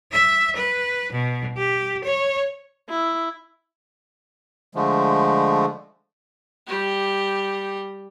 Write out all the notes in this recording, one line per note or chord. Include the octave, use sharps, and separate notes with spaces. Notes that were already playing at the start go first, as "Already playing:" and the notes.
E5
B4
B2
G4
C#5
E4
D3 F3 G#3 A3
G3 G4